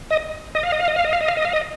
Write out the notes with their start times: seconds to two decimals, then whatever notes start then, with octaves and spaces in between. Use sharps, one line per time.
0.10 D#5
0.55 D#5
0.63 F5
0.72 D#5
0.80 F5
0.88 D#5
0.96 F5
1.05 D#5
1.13 F5
1.21 D#5
1.28 F5
1.37 D#5
1.45 F5
1.53 D#5